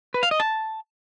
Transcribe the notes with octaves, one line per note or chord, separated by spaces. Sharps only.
B4
F5
D#5
A5